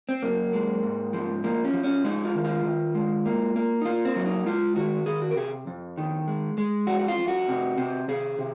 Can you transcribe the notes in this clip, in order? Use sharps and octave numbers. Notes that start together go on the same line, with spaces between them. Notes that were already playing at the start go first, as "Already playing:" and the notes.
C4
F#2 A#3
G#3
G#2
F3
F3 A#3
C#4
F3
C#4
G#3 D#4
F4
D#3
F4
D#3
G#3
A#3
A#3
D#4
A#3 F4
C4
F#3
D#4
G#3 F4
D#3 F#4
D#3 G#4
F#4
A#4
C3 G#4
F2
D#3
G#3
G#3
F2 F#4
F#4
F4
F2
F#4
C3
C3
C3 G#4
C3